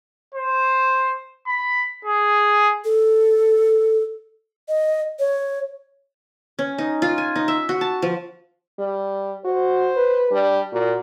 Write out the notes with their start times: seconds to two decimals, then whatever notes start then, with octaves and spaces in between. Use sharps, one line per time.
0.35 C5
1.47 B5
2.05 G#4
2.85 A4
4.69 D#5
5.19 C#5
6.59 C#4
6.78 D#4
7.02 F4
7.18 G#5
7.36 D#4
7.48 E5
7.69 F#4
7.81 A5
8.02 F3
8.79 G3
9.45 F#4 C5
9.97 B4
10.31 G3 D4
10.72 A#2 F#4